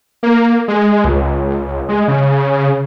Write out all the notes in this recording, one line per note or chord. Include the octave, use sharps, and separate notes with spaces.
A#3
G#3
C#2
G#3
C#3